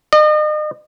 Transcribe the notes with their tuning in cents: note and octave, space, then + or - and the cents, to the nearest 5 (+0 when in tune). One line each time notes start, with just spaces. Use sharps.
D#5 -40